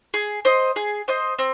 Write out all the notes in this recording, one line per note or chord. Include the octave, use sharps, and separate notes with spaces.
G#4
C5 D#5
G#4
C5 D#5
C4